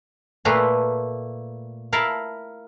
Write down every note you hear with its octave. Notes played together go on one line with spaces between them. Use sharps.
A#2 A3 B4 A#5 C6
E4 A#4 F5 A5 B5